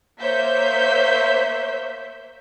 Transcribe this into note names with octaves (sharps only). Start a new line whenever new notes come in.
A#3 C5 C#5 E5 G6 B6